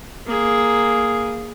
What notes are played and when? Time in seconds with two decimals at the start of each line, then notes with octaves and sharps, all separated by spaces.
0.26 A#3 G#4